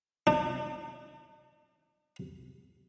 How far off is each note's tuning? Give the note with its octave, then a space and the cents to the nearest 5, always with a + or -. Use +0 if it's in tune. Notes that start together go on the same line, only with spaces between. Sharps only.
D4 +45